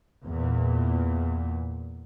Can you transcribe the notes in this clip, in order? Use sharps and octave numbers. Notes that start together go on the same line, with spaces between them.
E2 A#2